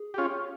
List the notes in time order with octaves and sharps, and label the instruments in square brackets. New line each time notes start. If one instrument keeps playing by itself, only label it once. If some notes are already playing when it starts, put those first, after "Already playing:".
Already playing: [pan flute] G#4
[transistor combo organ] G4
C#4 F4